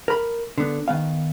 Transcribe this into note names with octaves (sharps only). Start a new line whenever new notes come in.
A#4 B5
D3 B3
D#3 B3 F5